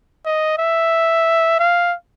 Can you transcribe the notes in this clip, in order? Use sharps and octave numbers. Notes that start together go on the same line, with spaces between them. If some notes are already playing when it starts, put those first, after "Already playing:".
D#5
E5
F5